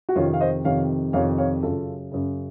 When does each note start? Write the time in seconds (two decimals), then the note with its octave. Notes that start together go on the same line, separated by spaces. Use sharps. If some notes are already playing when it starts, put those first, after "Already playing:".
0.09 F#4
0.15 F2 C3 D#3 C#4 F4
0.34 F5
0.40 C5 D#5
0.64 F2 C3 D#3 C#5 F5
1.13 F2 C3 D#3 C#5 F5
1.38 C#5 F5
1.63 F#2 C#3 F4 A4
2.11 F#2 C#3